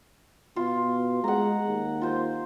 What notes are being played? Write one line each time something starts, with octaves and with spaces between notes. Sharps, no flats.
B2 F4
G#3 F#5 A#5
D#2
F4 C5